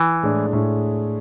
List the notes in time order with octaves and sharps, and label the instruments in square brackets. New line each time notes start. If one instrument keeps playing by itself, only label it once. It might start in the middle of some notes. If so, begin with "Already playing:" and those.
Already playing: [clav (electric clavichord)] E3
[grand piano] A2 G#3 D4 G#4
A2 G#3 D4 G#4